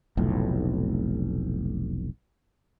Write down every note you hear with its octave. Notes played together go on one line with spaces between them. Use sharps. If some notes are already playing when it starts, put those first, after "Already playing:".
F1 B1 A2